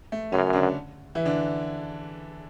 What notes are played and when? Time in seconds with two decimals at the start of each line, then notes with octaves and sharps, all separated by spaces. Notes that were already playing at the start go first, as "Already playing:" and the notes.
0.12 A3
0.32 F#2 C#3 C#4
0.53 D3 D4
1.15 E3 E4
1.25 D3 D4